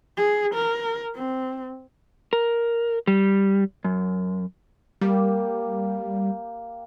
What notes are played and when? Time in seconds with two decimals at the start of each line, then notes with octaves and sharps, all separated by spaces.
0.17 G#4
0.54 A#4
1.15 C4
2.33 A#4
3.07 G3
3.85 F#2
5.01 G3 A#3 G4